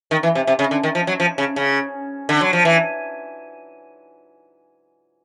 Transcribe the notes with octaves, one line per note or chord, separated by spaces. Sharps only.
D#3
E3
C3
C3
C#3
D3
D#3
F3
F#3
F3
C#3
C#3
D3
F#3
F3
E3